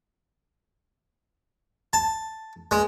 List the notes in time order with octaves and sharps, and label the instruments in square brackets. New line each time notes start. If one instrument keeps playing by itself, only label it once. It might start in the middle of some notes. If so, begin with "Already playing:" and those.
[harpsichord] A5
G#3